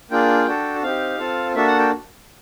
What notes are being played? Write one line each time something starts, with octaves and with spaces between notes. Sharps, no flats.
A#3 D4 F4 G#4 G5
D4 F#4 A4
C4 D#4 G4 F5
C4 F4 A4
A#3 D4 F#4 A4 E5
F#5
G5